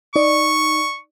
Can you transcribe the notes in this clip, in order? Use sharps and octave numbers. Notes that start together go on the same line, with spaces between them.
D#4 D5 C#6